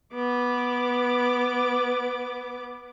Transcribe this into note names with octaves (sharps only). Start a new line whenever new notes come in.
B3 D6